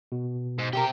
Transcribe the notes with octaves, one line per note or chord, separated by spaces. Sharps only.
B2
G#2
C3 G4 A#4 G5